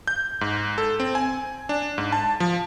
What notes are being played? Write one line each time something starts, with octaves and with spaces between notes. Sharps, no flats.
G6
G#2
A4
C4
G#5
D4
G#2
A5
F3